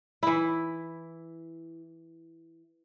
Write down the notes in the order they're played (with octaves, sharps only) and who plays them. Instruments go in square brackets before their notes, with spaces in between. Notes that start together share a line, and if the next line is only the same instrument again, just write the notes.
[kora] E3 E4